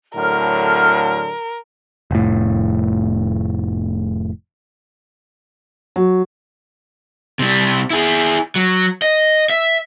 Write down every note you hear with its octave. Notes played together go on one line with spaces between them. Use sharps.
A2 D3 F#3 A#4 F6
F1 A2
F#3
C3 G3
E4 G#4
F#3
D#5
E5